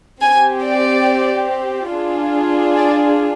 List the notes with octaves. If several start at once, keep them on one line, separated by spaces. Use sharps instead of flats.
C4 G4 G#5
D5
D4 F4 G#4
D5